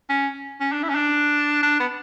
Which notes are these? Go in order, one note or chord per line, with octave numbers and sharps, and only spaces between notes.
C#4
C#4
D4
E4
C#4
D4
D4
B3